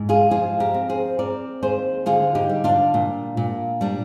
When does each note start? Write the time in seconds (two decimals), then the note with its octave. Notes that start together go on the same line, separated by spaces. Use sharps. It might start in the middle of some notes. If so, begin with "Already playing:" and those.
Already playing: G#2
0.09 F4 G#4
0.31 F3 F4 G#4
0.60 G4 A#4
0.74 C4
0.89 G#4 C5
1.19 C4 A#4 D5
1.63 D#2 G#4 C5
2.06 D3 F4 G#4
2.35 D#4 G4
2.50 G3
2.64 D4 F4
2.94 A#2
3.37 A#2
3.81 G3 D4